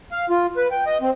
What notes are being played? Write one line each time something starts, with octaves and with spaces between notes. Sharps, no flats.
F5
F4
B4
G5
D#5
C4